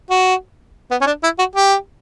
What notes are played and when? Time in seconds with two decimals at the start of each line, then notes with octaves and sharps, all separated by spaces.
0.10 F#4
0.91 B3
1.01 C#4
1.06 D4
1.23 E4
1.39 F#4
1.55 G4